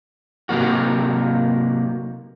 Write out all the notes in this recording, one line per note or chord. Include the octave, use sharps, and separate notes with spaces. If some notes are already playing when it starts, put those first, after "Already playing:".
C3 F#3 A#3 F#4